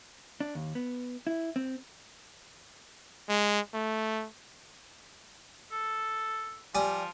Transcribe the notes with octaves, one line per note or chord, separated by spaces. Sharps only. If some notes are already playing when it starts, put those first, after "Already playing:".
D4
D#2
B3
E4
C4
G#3
A3
A4
F3 G3 G#5 D#6